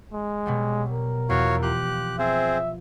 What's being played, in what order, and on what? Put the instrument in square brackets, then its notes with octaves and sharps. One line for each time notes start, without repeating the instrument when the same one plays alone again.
[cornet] G#3
[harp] B2 F#3 G3
[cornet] A#4
[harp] E2 F3 [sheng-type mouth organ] F#4 C#5 F5
[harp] F4 [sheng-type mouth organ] G4 F#6
[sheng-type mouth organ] C4 G#4 C5 [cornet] E5